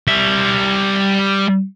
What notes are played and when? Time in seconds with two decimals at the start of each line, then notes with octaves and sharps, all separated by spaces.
0.07 G3 E5